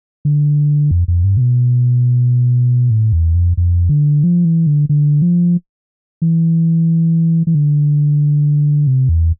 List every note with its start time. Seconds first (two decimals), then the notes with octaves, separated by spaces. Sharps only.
0.25 D3
0.91 F2
1.08 F2
1.24 G2
1.37 C3
1.41 B2
2.90 A2
3.13 E2
3.35 F2
3.57 F2
3.89 D3
4.24 F3
4.45 E3
4.67 D3
4.89 D3
5.22 F3
6.22 E3
7.47 E3
7.55 D3
8.87 C3
9.09 E2